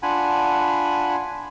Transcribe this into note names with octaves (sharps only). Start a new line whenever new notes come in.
D4 F4 F#5 G#5 B5